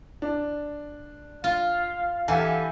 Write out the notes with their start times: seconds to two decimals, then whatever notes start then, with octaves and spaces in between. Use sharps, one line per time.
0.22 D4
1.44 F4 F5
2.28 E3 E4 G4 A4 F5 F#5 G#5